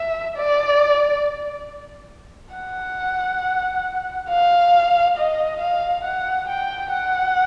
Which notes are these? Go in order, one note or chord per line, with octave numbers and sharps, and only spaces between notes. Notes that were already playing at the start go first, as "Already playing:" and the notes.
Already playing: E5
D5
F#5
F5
D#5
F5
F#5
G5
F#5